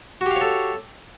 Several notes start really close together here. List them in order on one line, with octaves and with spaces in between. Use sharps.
F#4 G4 F5 C#5 A4